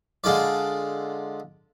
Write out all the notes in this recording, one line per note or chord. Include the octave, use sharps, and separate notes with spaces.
D3 G#3 F4 D5